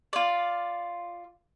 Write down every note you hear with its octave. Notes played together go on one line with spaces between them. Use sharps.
F4 D5